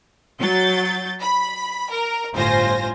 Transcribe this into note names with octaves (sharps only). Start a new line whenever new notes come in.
F#3 G6 A6
B5
A#4
G1 A2 F4 C5 G#5 A#6